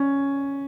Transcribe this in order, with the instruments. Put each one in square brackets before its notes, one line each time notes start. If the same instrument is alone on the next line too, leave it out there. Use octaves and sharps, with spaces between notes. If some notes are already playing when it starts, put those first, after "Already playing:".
Already playing: [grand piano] C#4